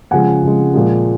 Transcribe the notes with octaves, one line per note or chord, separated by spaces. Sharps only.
C#3 F3 G#3 F#5 G#5
C#3 F3 G#3
A#2 F3 G#3